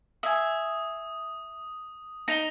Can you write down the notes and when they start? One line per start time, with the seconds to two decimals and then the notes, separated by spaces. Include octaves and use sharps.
0.23 E5 G#5 D#6
2.28 D#4 A#6 F7 G7